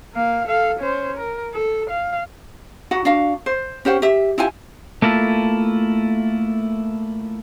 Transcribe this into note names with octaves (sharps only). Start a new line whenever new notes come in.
A#3 F5
A4 F5
C#4 C5
A#4
A4
F5
D#4 F#4 F#5
D4 F#4 F5
C5
C#4 G4 C5 F#5
G4 E5
E4 F4 G4 G#5
A3 A#3 E4 F4 A4